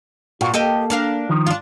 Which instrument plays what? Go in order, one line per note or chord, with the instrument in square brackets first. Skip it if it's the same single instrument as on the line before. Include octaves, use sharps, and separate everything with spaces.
[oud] A#2 [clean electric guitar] F4 F#4
[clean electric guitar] A#3 [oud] G4 A4 D#5
[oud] D4 A#4 F5
[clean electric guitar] D#3 F3
[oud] D4 F4